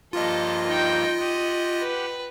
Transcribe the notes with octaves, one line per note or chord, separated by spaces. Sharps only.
G2 F3 A#3 F4 A4 D#5
D#4 G5
G4 F#5 D#6
B4